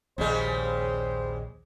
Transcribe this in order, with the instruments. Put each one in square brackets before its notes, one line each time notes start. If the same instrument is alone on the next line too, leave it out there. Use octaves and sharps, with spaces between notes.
[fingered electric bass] A#1 D#2 [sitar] C#3 G3 G#3 [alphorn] C5